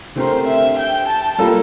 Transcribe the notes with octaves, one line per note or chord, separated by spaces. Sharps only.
D3 A3 C4 G4 A#4 C5
E5
G5
A5
G3 A#3 F4 A4